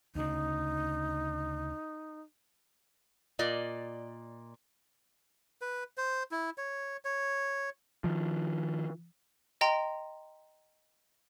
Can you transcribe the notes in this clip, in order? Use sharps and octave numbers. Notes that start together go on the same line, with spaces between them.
D2 C#3 D#4
A#2 D5 D#5
B4
C5
E4
C#5
C#5
D#3 F3
D#5 G5 A#5 C6